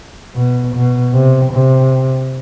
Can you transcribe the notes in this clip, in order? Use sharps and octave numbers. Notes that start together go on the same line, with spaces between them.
B2
B2
C3
C3